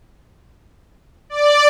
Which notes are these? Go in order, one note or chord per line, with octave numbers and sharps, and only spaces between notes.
D5